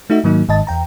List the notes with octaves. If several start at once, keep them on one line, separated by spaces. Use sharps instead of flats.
A3 D#4 F#4 E5
G#2 D#3 F#3 A#3 D#4
G1 G#2 D#3 D#5 A5 A6
E2 G5 A#5